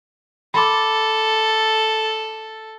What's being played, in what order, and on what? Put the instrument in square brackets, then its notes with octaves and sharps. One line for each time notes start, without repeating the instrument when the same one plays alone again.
[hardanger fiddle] A4 [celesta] B5 C6 D6